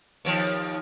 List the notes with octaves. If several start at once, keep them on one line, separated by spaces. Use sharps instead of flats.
D#2 F3